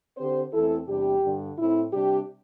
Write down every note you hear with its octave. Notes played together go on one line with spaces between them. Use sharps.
D3 C4 G4 C5
E2 E3 A3 C4 E4 A4
E2 C3 G3 D4 G4
G2 D3 G3
A2 A3 C4 E4
C3 G3 D4 G4